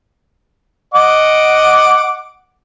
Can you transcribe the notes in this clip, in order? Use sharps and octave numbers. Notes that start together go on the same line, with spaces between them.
D#5 F#5 D6